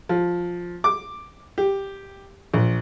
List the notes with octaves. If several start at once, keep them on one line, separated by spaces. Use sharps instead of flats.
F3
D6
G4
A#1